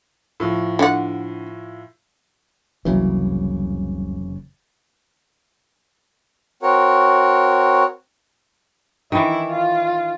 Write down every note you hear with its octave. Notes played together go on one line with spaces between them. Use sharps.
A2 F3
D3 F#5
F1 C2 C#3 E3 F#3 A#3
C4 F#4 A#4 C#5
D#3 E3 E4
F4